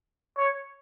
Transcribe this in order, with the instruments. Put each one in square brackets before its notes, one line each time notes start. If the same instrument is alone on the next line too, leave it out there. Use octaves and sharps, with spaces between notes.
[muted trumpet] C#5